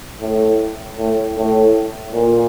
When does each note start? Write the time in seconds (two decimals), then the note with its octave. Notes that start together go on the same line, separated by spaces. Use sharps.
0.21 A2
0.98 A2
1.36 A2
2.14 A#2